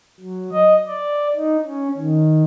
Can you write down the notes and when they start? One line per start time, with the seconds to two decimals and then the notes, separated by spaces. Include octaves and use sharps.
0.20 F#3
0.52 D#5
0.87 D5
1.36 D#4
1.66 C#4
1.98 D#3